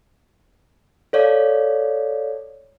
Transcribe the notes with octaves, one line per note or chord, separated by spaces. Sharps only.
A4 C#5 D5 F5